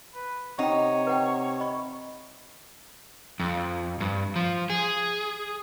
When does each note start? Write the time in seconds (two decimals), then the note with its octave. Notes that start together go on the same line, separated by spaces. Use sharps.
0.14 B4
0.59 C3 D#4 C#5 F#5 G5
1.07 B4 F#5 G5
1.60 D#5 B5 C#6
3.40 F2
4.00 G2
4.36 F3
4.70 G#4